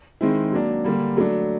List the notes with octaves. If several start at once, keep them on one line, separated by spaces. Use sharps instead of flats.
D#3 G#3 C4 E4
F#3 A#3 D4
D3 G3 A#3
F#3 A3 D4